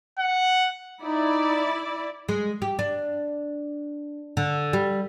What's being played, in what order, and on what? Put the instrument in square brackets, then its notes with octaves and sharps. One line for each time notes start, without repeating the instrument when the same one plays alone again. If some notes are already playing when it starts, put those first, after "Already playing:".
[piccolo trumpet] F#5
[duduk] D#4 [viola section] E4 D5
[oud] G#3
G4
D4
D3
G3